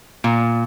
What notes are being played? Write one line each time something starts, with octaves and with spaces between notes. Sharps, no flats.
A#2